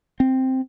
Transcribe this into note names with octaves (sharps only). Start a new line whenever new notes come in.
C4